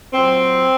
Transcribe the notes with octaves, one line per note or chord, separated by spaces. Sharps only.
A#2 F#3 C4